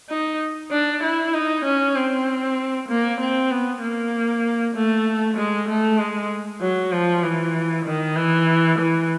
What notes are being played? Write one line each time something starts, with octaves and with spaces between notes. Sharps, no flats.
D#4
D4
E4
D#4
C#4
C4
A#3
C4
B3
A#3
A3
G#3
A3
G#3
F#3
F3
E3
D#3
E3
E3